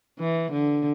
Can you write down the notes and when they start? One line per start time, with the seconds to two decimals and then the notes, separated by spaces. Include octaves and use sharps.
0.19 E3
0.52 D3